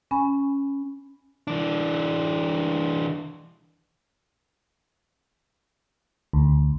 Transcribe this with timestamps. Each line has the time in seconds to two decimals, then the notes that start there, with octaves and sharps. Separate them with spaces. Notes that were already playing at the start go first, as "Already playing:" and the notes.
0.11 C#4 G#5 B5
1.47 E3 D4
6.33 D2